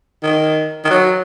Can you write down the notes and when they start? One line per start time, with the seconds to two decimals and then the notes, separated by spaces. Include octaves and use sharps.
0.23 D#3
0.84 D#3
0.90 F#3